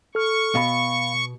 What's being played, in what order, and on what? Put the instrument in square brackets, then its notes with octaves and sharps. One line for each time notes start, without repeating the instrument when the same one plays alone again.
[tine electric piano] A4 F6 [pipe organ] C#6
[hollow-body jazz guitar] B2 [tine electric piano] F5 B5